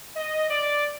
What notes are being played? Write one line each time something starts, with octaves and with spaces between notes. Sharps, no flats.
D#5
D5